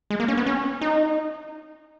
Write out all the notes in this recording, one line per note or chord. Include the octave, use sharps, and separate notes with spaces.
G#3
A#3
C#4
B3
C#4
D#4